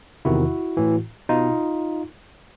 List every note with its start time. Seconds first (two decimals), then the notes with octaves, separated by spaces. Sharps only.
0.25 E2 C3 D#3 E4 F#4
0.77 A2 E3
1.29 B2 D#4 F4